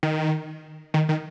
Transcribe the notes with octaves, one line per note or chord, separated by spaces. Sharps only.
D#3
D#3
D#3